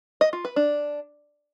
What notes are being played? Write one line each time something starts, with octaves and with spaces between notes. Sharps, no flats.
D#5
F4
B4
D4